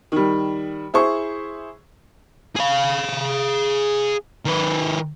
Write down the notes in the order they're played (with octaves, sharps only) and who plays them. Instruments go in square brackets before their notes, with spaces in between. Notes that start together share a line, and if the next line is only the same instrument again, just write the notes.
[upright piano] D#3 G3
E4 G#4 C5 C#6
[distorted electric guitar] G#4 F5
D#3 B4